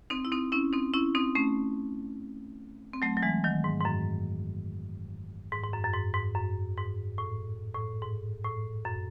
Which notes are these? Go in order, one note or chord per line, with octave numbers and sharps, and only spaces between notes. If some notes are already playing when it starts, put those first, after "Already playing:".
C4 D#4
E4
C4 D#4
C#4 E4
C4 D#4
C#4 E4
C4 D#4
A3 C#4
C4
F#3 A3
F#3
E3 G#3
D#3 F#3
G#2
G#2
F#2
G#2
G#2
F#2
F#2
G#2
G#2
F#2
G#2
A2
A2
G#2
A2
F#2